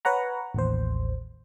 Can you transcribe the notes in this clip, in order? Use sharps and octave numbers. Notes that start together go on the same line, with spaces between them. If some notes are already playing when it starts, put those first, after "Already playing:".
B4 C#5 F#5 A#5
A1 D#2 C5